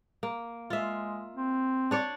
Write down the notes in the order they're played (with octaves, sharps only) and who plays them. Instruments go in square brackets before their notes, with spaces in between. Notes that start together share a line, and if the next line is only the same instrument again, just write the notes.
[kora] A#3
[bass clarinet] G#3 [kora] F4 E5
[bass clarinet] C4
[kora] D4 C#5 D5